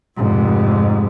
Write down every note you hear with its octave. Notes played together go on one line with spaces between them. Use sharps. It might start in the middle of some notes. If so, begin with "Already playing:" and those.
F1 G#2